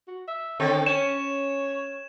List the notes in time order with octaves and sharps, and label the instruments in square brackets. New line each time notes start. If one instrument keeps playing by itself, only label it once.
[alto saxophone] F#4
E5
[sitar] D3 C4 A4 [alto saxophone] C#5
[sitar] C#4 [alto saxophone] C#5 [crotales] E7